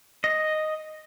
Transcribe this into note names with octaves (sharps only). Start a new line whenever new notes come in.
D#5